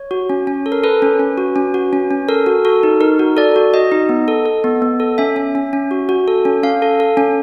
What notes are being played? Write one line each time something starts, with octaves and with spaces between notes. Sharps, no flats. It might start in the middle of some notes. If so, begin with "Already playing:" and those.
Already playing: C#5
F#4
C#4
C#4
A4
A#4
A4 B4
C#4
C#4
F#4
C#4
F#4
C#4
C#4
A4 A#4
F#4
F#4 A4
D#4
D#4 A#4
F#4
A4 D5
F#4
F#4 D#5
D#4
B3
A4
A4
B3
B3
A4
C#4 E5
C#4
C#4
C#4
F#4
F#4
A4
C#4
C#4 F5
A4
A4
C#4